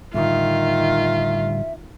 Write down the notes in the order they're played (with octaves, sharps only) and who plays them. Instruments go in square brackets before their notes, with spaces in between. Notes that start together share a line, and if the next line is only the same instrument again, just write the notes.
[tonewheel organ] A2 D3 G3 [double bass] D#3 [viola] F4 [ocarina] E5